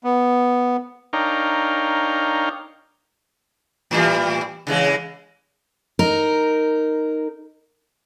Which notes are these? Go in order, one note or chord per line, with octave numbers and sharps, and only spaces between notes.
B3
D4 D#4 A#4 C#5 F5 G5
A2 E3 G3
C#3 E3 G#3
D#4 A#4